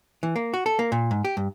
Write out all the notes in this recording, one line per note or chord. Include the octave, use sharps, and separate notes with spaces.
E3
A#3
F#4
A4
A#3
A#2
G#2
G4
G2